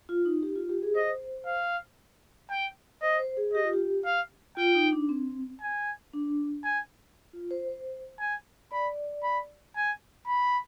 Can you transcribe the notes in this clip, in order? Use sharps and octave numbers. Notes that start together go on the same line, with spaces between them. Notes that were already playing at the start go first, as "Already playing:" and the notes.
F4
D#4
G4
F4
G4
G#4
C5 D#5
F5
G5
C5 D#5
C5
G#4
G4 D#5
F4
G4
F5
F4 G5
D#4
D4
C4
G#5
D4
G#5
F4
C5
C5
G#5
D5 B5
B5
G#5
B5